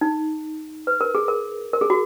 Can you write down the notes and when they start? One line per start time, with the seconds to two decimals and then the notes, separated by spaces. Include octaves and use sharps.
0.01 D#4
0.87 B4
1.01 A#4
1.15 G#4
1.28 A#4
1.73 A#4
1.81 G#4
1.90 F#4